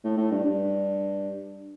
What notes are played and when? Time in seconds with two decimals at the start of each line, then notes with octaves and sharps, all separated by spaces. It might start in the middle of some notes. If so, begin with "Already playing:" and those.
0.04 A2
0.17 A2
0.31 G2
0.45 G2